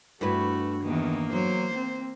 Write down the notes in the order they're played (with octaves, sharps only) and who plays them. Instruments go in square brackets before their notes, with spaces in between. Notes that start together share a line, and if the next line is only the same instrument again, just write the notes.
[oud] G2 E4 B4 [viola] A3 F#4
[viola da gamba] E2 D#3 [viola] A#3
[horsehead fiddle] F#3 [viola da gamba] C5
[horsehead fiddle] C4